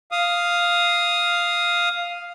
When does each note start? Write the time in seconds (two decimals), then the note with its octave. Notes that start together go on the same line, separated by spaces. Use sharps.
0.12 F5 D#6